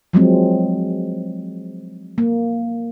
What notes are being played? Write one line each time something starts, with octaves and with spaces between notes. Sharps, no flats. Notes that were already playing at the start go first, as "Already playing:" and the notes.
F3 F#3 G#3 C4
A#3